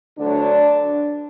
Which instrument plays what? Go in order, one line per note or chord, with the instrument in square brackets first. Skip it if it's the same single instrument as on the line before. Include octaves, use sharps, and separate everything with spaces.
[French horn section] D2 D3 F#3 D4